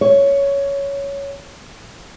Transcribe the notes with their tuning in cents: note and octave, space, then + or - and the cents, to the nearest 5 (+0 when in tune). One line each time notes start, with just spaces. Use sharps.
C#5 +10